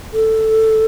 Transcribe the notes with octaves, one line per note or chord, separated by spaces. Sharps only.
A4